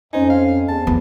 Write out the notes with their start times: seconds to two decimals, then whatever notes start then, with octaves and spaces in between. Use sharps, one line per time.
0.13 F2 C#4 D#4 C5 G#5
0.30 F5
0.68 E2 A5
0.87 E2 B3